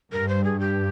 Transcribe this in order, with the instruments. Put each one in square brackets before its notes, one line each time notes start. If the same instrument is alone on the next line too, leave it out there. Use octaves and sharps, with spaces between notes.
[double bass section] G2 [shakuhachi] A#4
[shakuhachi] C5
G#4
G4